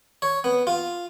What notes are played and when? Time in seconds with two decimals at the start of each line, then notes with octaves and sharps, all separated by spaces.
0.22 C#5
0.44 B3
0.67 F4